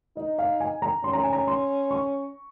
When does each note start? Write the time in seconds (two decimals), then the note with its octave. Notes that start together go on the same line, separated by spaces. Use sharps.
0.17 D#4 D#5
0.39 F5
0.60 G#5
0.82 A#5
1.04 C#4 C6
1.13 A#5
1.23 G#5
1.33 A#5
1.47 C6
1.91 C#6